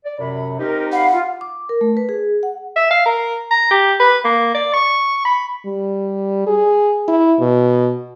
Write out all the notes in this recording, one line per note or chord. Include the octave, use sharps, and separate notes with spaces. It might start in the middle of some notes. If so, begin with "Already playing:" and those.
D5
F#2 C3 B5
C4 D#4 G4 A#4
F5 F#5 B5
F4
D6
A#4
A3
B4
G#4
F#5
E5
F5
A#4
A#5
G4
B4
A#3
D5
C#6
B5
G3
G#4
E4
B2